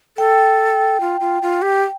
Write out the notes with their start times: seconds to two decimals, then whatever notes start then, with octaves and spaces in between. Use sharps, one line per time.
0.17 A4 G5
1.01 F4
1.20 F4
1.42 F4
1.62 G4